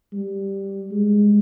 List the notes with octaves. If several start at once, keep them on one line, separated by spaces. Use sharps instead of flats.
G3
G#3